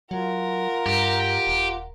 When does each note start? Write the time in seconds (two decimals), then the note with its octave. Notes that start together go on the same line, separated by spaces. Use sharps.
0.11 F#3 F4 A#4 F#5
0.86 G2 G4
1.47 D#1